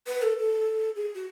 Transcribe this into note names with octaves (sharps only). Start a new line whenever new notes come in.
B4
A4
A4
G#4
F#4